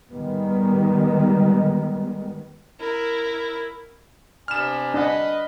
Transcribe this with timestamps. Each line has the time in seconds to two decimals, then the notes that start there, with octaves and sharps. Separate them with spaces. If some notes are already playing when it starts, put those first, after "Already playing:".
0.12 D#3 G3 G#3 B3
2.79 E4 A#4
4.48 C3 B3 D4 G#5 F6 E7
4.94 D4 B4 D#5 F#5